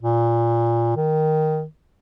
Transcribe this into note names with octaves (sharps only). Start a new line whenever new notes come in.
A#2
D#3